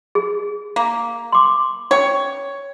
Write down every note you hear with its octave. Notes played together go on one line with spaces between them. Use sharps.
G#4
A#3
C6 D6
C#4 C#5 G5